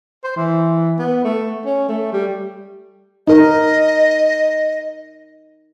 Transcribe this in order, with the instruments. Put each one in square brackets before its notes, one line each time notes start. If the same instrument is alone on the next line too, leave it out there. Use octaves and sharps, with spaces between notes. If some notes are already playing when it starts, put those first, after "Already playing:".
[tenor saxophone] C5
E3
B3
A3
C#4
A3
G3
[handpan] D#4 A#4 [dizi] D#5